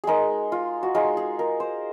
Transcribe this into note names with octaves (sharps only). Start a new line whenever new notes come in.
G#3 D#4 G#4 A#4
F4
F#4
G#3 D#4 F4
G#4
A#4
C5